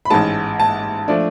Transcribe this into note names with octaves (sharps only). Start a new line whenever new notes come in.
B5
A1 G#2 G#3 A5
A5
F3 A3 D4